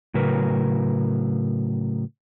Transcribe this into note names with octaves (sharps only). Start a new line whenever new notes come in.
A2 C#3 F#3 A#4 B4